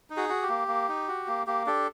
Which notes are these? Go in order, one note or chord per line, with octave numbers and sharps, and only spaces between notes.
D#4
F#4 G#4
F#4
G4
A#3
A#3
D#4
F#4
A#3
A#3 G4
D4 G4 A4